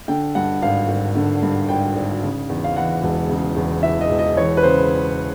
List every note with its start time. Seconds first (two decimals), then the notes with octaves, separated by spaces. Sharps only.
0.08 D3 G5
0.35 G2 F#5
0.62 G#1 F5
0.88 G#1
1.15 D3
1.42 G2
1.69 G#1 G5
1.96 G#1
2.23 C#3
2.49 E2
2.64 F5
2.76 E3 F#5
3.03 E1
3.29 C#3
3.56 E2
3.83 E3 E5
4.01 D#5
4.10 E1
4.19 D#5
4.37 E3 C#5
4.57 B4
4.63 C#3 C5